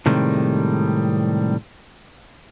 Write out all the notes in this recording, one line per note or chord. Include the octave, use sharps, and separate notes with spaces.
A2 C3 D#3 G3 G#3